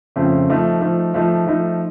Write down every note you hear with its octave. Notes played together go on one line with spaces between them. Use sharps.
F2 C#3 A3 C4
F3 A3 D#4
F3 A3 D#4
F3 A3 D#4
F3 A3 D#4